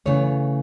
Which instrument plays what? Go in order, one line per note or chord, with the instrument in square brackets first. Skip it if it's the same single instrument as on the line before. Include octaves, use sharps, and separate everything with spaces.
[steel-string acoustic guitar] C#3 E3 A3 C#5